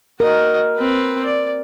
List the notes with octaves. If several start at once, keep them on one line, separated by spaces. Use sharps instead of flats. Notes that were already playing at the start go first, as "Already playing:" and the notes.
F#4 A#4 D#5
C4 B4
D5